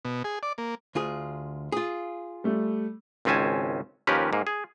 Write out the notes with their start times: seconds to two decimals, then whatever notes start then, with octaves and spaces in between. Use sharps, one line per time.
0.05 B2
0.24 G#4
0.43 D5
0.58 A#3
0.95 D2 F4 G#4
1.72 F4 G#4
2.44 G3 A3
3.25 G#1 C#2 C4 C#4 G#5 A5
4.07 D#2 F3 C#4 G4 A#4 B4
4.33 G#2 A#3
4.47 G#4